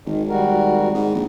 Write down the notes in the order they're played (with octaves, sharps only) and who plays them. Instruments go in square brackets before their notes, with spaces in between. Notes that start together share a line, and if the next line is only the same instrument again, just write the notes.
[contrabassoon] G#1 [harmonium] D#3
[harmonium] G3 F#4 A#4
[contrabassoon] G#2
A#1